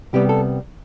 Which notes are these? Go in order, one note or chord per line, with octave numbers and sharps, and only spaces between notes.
C2 C3 G3 B3 G4
A4